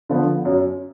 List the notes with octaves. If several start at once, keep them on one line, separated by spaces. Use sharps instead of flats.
D3 F3 B3
F#2